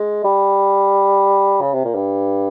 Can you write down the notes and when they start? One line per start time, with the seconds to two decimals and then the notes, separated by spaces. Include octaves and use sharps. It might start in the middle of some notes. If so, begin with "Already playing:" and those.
Already playing: G#3
0.24 G3
1.61 C#3
1.73 C3
1.85 A#2
1.95 G2